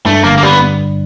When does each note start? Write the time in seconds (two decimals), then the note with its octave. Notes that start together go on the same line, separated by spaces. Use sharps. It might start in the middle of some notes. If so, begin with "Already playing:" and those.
0.06 G2 A3
0.24 G1 A#3
0.37 A#3
0.43 G3 B3